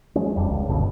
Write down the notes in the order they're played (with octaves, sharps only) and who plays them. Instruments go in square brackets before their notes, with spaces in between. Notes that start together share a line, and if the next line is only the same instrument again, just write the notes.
[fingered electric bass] F3 G#3 C#4
D#1 F2 G3
C#2
F#1 G2 B2 D3